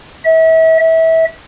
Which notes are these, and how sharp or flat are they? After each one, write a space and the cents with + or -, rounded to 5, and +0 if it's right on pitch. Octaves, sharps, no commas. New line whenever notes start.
E5 -35
E5 -25